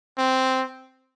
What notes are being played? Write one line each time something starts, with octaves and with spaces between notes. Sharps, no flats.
C4